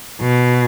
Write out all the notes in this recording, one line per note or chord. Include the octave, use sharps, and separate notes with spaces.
B2